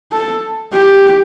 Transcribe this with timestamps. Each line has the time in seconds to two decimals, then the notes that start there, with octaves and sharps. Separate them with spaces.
0.12 A4
0.73 G4